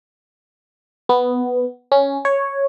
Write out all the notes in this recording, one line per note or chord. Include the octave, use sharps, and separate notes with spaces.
B3
C#4
C#5